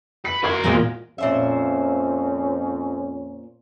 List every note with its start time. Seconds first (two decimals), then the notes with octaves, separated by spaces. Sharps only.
0.25 B4 C#7
0.44 F#4 A#4 F5 C6 C#6 G#6
0.64 E2 A#2 F3 G#3
1.18 F2 A#2 C#4 C5 E5